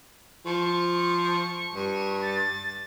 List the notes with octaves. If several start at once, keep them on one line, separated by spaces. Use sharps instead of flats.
F3 C#6
G2
A6